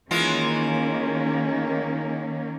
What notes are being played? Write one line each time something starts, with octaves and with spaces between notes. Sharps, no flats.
D#3 E3 G#3 A#3 C#4 F4